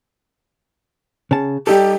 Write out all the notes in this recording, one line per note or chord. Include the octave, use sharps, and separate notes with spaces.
C#3 A5
G3 D#4 G4 A4